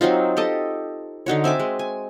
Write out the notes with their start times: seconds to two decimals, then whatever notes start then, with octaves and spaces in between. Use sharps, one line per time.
0.01 F#3 C4 D#4 F4
0.37 G4 A4 D#5 A5
1.26 D3 D#4 F#4 C#5
1.44 C4 E5 G#5 D6
1.60 G#3
1.79 G#5